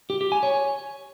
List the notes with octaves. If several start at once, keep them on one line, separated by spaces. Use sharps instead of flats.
G4
G4
G#5
C#5